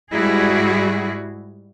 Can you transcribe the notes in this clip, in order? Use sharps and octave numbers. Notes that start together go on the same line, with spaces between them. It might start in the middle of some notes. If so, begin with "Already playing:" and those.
G#2 G3 E4 F#4 G#4